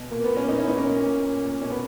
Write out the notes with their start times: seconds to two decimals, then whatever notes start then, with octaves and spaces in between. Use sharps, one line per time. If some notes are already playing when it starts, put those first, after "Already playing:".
Already playing: B2
0.10 A#2 A#3
0.24 B3
0.30 A#2
0.36 A#3 C#4
0.49 A#2 B3 D#4
0.58 C#4 E4
0.67 A#2 B3 D#4
0.76 A#3 C#4
0.87 A#2
1.05 A#2
1.24 A#2
1.42 A#2
1.62 B2 C#4
1.70 B3